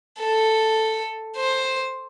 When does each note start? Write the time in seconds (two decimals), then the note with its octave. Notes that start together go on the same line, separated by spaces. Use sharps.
0.19 A4
1.37 C5